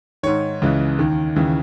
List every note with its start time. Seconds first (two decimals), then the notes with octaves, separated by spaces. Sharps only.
0.23 G#2 D#3 C#5
0.62 C#2 C#3 E3
0.99 D#2 D#3
1.36 D#2 C#3 E3